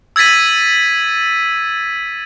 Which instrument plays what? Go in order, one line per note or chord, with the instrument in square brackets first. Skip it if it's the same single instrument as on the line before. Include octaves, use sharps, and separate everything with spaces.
[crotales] E6 G#6 A6 B6 D#7